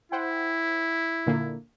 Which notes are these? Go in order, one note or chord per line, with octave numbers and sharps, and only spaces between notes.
E4 C5 F#5 G5
A#2 D3 A#3